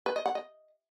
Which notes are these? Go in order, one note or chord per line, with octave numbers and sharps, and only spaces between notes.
B4
D#5
F#5
D#5